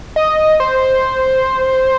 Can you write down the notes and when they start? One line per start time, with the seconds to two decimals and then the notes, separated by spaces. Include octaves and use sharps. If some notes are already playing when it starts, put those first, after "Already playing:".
0.16 D#5
0.60 C5